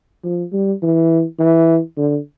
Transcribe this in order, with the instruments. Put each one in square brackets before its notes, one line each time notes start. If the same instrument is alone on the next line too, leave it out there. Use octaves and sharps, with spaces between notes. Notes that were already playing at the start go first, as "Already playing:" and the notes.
[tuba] F3
G3
E3
E3
D3